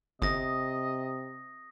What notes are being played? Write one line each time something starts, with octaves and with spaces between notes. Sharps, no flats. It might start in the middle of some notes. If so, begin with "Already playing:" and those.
G1 C3 D#5 D#6 A#6